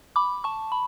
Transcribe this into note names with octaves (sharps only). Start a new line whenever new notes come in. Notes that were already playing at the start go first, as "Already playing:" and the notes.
B5 D6
A5 C#6
B5